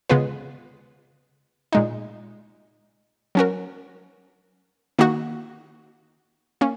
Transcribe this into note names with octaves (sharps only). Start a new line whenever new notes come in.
C#3 G#3 B3 F4 B4
A#2 G#3 D#4
F#3 C#4 F#4 A#4
D#3 A#3 D#4 F#4
A#3 C#4